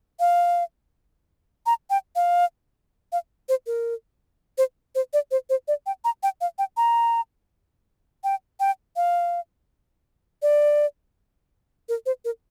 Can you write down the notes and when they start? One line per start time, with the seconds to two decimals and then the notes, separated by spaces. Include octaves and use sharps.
0.20 F5
1.66 A#5
1.90 G5
2.16 F5
3.12 F5
3.49 C5
3.67 A#4
4.58 C5
4.95 C5
5.13 D5
5.31 C5
5.50 C5
5.68 D5
5.86 G5
6.04 A#5
6.23 G5
6.41 F5
6.58 G5
6.77 A#5
8.24 G5
8.60 G5
8.96 F5
10.42 D5
11.89 A#4
12.06 C5
12.25 A#4